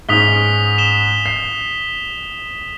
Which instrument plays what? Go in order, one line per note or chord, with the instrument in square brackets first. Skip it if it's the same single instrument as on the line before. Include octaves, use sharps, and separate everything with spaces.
[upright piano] G#2 C#4 [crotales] D#6 B6 G7
[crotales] E7 G7
[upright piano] C7